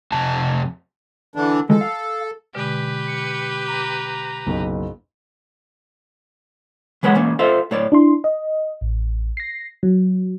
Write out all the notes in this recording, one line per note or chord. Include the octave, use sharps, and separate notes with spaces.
F2 C3 A5
D3 E3 D4
E3 F3 G#3 A4
F5
B2 D3 G#3 G4 B4
C#7
A#5 D6
F#1 B1
E3 G#3 B4 C#5 F#5
E3 A#3 C#4
F4 A4 C5 E5 F5
A2 C#5 D5
D4 E4 C6
D#5
A1
A#6 C7
F#3